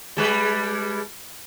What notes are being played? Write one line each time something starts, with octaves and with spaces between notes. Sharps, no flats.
G3 G#3 B4